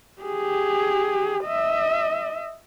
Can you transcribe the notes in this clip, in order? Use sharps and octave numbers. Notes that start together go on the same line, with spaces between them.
G4 G#4
D#5 E5